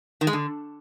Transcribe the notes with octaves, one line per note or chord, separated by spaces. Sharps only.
D#3
G#3
D3